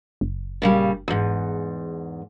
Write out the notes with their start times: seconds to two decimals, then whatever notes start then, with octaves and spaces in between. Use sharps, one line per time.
0.21 F#1
0.62 A#2 C#3 G3
1.08 E2 G#2